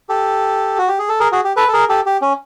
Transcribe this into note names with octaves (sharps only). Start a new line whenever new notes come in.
G4 A4
F#4
G4
G#4
A4
G#4 A#4
F#4 G#4
G4
A4 B4
A4
G#4 A#4
G4 A4
G4
C#4